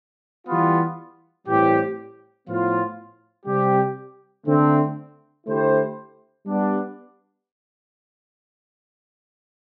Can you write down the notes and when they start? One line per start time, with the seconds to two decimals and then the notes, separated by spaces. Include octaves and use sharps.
0.46 E3 G3 B3 F4
1.46 A2 E3 G3 C4 G4
2.47 A2 F3 B3 F4
3.46 C3 G3 C4 G4
4.46 D3 A3 C4
5.45 D3 A3 E4 G4 C5
6.45 G3 B3 D4